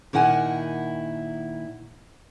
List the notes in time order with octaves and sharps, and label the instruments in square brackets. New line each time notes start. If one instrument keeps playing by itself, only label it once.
[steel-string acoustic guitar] A#2 D#3 E4 F#5 G#5